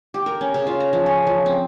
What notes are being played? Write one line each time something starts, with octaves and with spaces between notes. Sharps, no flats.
G4
A#4
C#4
C#3
F4
A#5
F3
C#4
F3
C4